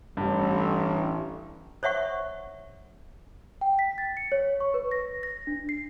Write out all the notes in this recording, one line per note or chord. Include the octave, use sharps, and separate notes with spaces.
A1 G2
C5 C#5 E5 F#5 C#6
G5
B6
A6
C#7
C#5
C#6
B4
A#6
A#6
D4
C7